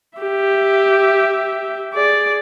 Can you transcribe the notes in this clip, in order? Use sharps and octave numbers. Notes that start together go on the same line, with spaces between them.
G4 E5
G#4 D5